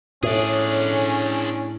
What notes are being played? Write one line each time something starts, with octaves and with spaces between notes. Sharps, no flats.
A2 C#4 D4 G#4